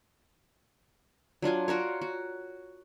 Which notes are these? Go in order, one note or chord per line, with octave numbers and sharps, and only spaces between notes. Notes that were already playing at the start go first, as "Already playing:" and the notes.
F#3 D4 F4 G#5
F4 F#4 A#4 C#5
F#4